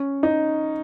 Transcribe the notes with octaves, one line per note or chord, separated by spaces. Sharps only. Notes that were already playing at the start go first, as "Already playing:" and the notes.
Already playing: C#4
D#4